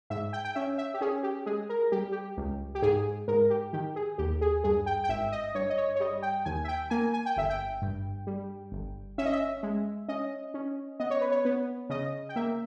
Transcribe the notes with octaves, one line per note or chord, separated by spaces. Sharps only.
G#2 E5
G5
G5
C#4 E5
E5
G4
C#4 G#4
G4
G#3 G#4
A#4
G3 G4
G4
C#2
G4
G#2 G#4
G#2 A#4
G4
D#3 G4
G#4
D#2 G4
G#4
G2 G#4
G5
G5
G#1 E5
D#5
G2 C#5
D#5
C#5
C#5
G3 D#5
G5
D#2 G#5
E5
G5
A#3 G#5
G#5
G5
G1 E5
G5
G2
G3
G1
C#4 E5
D#5
E5
G#3
C#4 D#5
C#4
B3 D#5
C#5
B4
C#5
B3
C#3 D#5
G5
A#3 E5